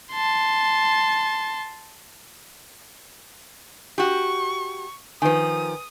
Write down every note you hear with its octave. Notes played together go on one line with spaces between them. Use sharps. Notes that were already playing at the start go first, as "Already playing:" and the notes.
A5 C6
F#4 G4 C#6
D#3 F3 B4 G#5 D#6